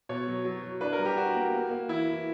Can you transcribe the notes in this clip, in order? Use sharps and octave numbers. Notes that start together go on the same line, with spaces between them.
B2 C#5
F#3
F#3
F#3
D4 B4
A#4
G3
G4
D4 F#4
A#3
A#3
A#3
E3 E4
E3